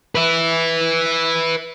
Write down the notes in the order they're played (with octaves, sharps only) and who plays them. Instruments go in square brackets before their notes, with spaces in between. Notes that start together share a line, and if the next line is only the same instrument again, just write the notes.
[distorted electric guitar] B4 E5